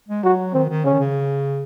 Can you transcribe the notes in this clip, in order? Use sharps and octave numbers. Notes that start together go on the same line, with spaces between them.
G#3
F#3 F#4
D#3 C4
D#3
C#3 C#4
D#3
C#3